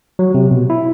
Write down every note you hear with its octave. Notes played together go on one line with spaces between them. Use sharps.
F#3
C3
B2
E4